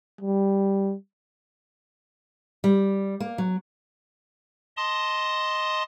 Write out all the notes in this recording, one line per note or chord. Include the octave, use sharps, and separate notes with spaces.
G3
G3
A#3
F#3
D#5 A5 C6 D#6